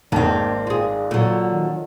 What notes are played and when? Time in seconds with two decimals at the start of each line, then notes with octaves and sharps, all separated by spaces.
0.12 G#1 G#2 D#3 A#3 C4 D5 A5
0.67 F4 G#4
1.11 A#2 D3 F#3
1.50 D#3